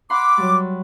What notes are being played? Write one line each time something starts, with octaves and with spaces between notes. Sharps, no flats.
F#5 B5 C6 D6
F#3 G3